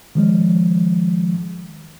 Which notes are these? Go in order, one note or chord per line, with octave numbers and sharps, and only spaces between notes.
D#3 F3 G#3